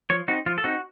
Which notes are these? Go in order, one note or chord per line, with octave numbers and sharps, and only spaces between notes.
F3 C#5
C4 D#4 F#4
F3 F4
A4
C4 D#4 F#4